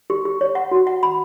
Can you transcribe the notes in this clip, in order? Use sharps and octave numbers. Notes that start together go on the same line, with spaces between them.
G4
G4
C#5
F#5
F#4
F#5
B5